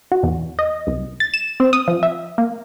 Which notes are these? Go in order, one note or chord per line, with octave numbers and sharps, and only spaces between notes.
F#4
E2
D#5
C2
A6
E7
C4
D#6
F3
E5
A#3